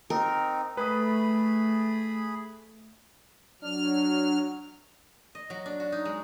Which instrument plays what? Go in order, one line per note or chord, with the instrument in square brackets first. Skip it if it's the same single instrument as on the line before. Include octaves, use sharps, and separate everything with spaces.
[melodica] C4 D#4 [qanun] A#4
[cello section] A3 [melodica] G#4 B5 [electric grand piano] B4 D#6
[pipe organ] F#3 F6 [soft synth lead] D4
[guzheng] D#5
F#3
D4
F#4
D#4
G#3